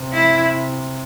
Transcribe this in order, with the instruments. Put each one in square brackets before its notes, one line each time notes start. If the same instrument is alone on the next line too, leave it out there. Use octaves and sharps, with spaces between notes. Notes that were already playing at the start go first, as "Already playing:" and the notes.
Already playing: [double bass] C3
[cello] E4